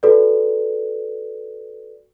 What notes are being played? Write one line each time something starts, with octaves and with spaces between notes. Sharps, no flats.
F#4 A4 B4 D5